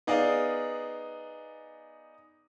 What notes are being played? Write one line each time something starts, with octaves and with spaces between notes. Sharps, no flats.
B3 D#4 G#4 D5 F5